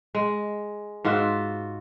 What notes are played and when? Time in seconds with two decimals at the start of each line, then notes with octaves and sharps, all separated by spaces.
0.15 G#3
1.04 G#2 F4 F#4 E5